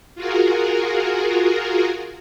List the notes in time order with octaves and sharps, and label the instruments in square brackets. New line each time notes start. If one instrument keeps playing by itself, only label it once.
[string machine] F4 F#4 G#4 A#4